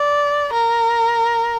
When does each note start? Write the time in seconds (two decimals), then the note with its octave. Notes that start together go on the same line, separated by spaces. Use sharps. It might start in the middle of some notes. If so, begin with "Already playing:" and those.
Already playing: D5
0.54 A#4